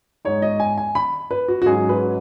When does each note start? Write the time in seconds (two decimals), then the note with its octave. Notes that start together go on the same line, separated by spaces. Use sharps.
0.25 G#2 G#3 D#4 C#5
0.42 D#5
0.60 G#5
0.78 G#5
0.95 B5
1.31 B4
1.48 F#4
1.62 F#4
1.66 G#2 F#3 C#4 G#4
1.89 B4